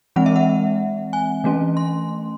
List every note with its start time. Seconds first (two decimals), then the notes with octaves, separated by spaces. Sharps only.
0.16 E3 G#3 C4 F#5
0.26 E5
0.36 F#5
1.13 G#5
1.44 E3 A3 C#4
1.77 C6